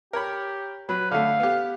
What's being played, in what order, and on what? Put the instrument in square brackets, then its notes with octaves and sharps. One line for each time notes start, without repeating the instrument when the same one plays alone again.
[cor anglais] G4 [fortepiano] A#4 C#5 B5
[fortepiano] F#3 [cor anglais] B4
[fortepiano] D3 A3 [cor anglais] F5
[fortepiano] B3 G4